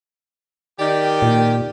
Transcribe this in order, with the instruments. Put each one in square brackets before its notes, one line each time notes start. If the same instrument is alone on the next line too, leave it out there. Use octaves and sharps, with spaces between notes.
[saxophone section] D#3 [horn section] G4 [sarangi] D5
[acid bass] A#2